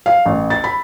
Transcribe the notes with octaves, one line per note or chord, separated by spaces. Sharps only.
F5
A1
A6
B5